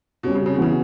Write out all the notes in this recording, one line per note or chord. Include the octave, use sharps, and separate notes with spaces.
B2 G3 C#4 F#4
C#3
C#3
B2
C#3 E3 B3 F#4